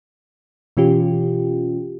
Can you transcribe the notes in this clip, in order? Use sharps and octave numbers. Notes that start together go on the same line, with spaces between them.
B2 E3 C#4 F4 G4